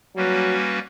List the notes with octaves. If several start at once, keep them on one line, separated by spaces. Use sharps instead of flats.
F#3 G3 A#3 C#4 F#4 B4